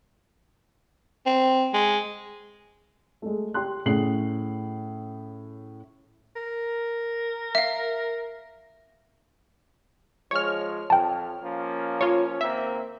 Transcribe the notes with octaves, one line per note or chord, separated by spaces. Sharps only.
C4
G#3
G#3 A3
G4 G5 C6 F#6
A2 C#3 G#4 C7 F#7
A#4
E5 F5
F3 G#3 C#5 F6
F2 G5 A5
F3 A#3 C#4
F4 C#5
D#2 A#3 C4 E5